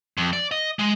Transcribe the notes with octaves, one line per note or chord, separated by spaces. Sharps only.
F2
D5
D#5
G#3